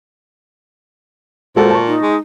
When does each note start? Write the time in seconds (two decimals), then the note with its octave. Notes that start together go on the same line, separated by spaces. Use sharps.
1.56 A#2 G#3 F#4 A4 C5
1.70 A5 C#6
1.87 D#4
2.03 G#3